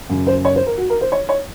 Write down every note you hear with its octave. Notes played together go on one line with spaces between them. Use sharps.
F#2 C#3
C5
C#5
C5
A#4
F#4
A#4
C5
C#5
C#5